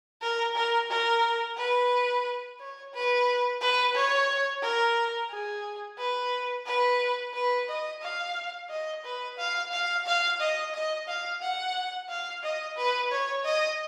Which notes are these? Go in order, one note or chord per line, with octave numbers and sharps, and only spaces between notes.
A#4
A#4
A#4
B4
C#5
B4
B4
C#5
A#4
G#4
B4
B4
B4
D#5
F5
D#5
B4
F5
F5
F5
D#5
D#5
F5
F#5
F5
D#5
B4
C#5
D#5